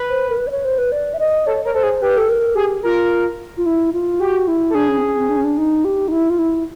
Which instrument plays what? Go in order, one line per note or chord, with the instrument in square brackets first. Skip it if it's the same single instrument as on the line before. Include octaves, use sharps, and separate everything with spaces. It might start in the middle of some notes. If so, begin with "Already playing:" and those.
Already playing: [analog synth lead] B4
[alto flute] C5
A#4
B4
D5
C#5
C5
B4
D5
E5
D#5
[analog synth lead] A4 [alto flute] C#5
[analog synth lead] A#4 [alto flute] C#5
[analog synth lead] A4 [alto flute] C5
[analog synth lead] G#4
[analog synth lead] G4 [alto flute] B4
[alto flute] A4
A#4
[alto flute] G4 [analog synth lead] G#4
[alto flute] F4 [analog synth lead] A#4
[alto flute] F4
E4
F4
[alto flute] F#4 [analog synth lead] G4
[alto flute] E4
[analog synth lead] A4
[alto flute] D4 [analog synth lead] G#4
[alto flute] C#4
C4
C#4
C4
D4
C#4
D4
D#4
G4
D#4
E4
F4
E4